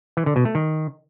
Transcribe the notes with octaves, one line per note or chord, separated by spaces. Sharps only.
E3
D3
B2
A3
D#3